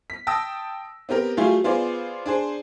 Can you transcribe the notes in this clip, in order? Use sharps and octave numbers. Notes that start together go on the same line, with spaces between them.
B6
G5 A5 D#6 E6 A#6
B3 C4 G4 A#4
F#3 G3 A3 F4 G4 G#4
B3 F4 G#4 C5 D5
D4 G#4 C5